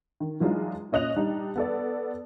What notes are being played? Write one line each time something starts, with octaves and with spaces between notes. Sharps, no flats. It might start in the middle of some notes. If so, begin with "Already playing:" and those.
D#3
E3 F#3 G#3 D4 D#4 F4
A#2 C#4 D#5 F#6 F7
G3 D4 D#4
B3 A4 D5